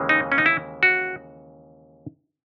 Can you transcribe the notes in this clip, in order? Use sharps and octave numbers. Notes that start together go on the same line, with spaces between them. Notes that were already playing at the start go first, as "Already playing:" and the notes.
Already playing: D#2 C#3 E3 G#3
D#4
C#4
D#4
E4
F#4